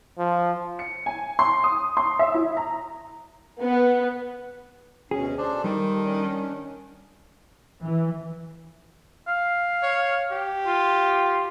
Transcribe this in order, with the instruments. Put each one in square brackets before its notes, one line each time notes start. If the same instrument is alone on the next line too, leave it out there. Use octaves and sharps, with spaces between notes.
[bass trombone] F3
[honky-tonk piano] C#7
G#5
C6
D#6
C6
E5
E4
A#5
[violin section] B3
[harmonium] D2 B2 C#4 [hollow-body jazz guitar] G#4
[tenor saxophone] D4 [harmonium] A4 C5
[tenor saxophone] D#3 [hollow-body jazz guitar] G3
[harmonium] C#4 D4
[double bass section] E3
[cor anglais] F5
[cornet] C#5
G4
[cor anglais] F4